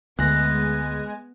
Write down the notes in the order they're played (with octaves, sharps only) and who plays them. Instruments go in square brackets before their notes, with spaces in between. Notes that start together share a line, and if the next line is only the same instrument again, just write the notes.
[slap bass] D2 [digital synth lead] G#3 [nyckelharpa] B3 [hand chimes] F#6 A#6